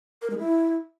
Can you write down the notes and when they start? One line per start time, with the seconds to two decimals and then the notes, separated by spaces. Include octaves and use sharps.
0.22 A#4
0.30 G#3
0.38 E4